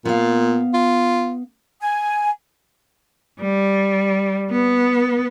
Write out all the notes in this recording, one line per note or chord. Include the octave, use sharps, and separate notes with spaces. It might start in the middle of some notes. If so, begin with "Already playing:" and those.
A#2 B3 F5
F4
G#5
G3
B3